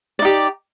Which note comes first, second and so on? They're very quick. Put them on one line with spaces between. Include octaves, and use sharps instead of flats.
D5 D#4 G4